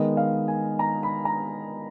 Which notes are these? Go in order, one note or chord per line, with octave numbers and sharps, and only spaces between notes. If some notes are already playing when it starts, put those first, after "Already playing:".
Already playing: D#3 G#3 B3 D#5
F5
G#5
A#5
B5
A#5